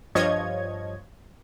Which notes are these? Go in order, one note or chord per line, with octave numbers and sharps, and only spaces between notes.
G2 F3 C#5 D#5 G#6